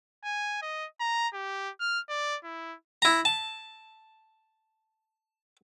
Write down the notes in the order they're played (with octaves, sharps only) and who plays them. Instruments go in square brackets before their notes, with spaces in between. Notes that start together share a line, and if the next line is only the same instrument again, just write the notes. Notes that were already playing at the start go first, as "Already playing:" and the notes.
[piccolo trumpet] G#5
D#5
A#5
G4
F6
D5
E4
[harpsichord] E4 A#5
A5